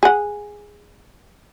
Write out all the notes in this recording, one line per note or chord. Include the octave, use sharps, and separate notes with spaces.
G#4 F#5